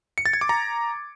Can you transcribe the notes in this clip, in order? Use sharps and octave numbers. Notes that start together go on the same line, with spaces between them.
C#7
A6
G#6
D6
A#5